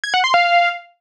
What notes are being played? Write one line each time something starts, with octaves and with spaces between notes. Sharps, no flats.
G#6
F#5
C6
F5